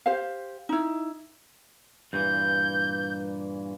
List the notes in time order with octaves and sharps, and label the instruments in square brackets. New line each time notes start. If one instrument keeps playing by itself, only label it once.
[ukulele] G4 C5 F5
D#4 E4
[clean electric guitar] G2 A#2 E3 [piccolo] G6